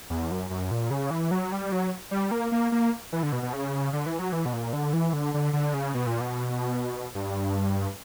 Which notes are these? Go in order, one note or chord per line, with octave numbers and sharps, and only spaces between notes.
E2
F#2
F#2
A#2
C#3
E3
F#3
G3
F#3
G3
A#3
A#3
A#3
E3
D3
B2
B2
C#3
D3
E3
F#3
E3
B2
A#2
D3
E3
D3
D3
D3
C#3
B2
A#2
B2
G2